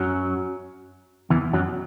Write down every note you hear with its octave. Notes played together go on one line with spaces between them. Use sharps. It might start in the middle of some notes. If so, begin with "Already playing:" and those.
Already playing: F#2 F#3
E2 E3
F#2 F#3